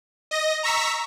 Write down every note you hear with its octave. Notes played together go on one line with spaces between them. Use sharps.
D#5 A#6
A#5 C#6 E6 B6